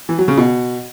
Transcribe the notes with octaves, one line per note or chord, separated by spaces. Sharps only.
E3
F#3
C#3
B2